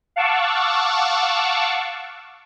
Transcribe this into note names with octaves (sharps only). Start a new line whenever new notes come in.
F5 F#5 A5 C#6 D6 E6